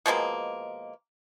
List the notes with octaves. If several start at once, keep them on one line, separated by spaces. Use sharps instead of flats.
B2 F3 G#3 A#3